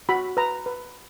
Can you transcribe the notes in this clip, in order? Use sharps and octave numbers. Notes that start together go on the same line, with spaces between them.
F#4 B5
B4 A#5
B4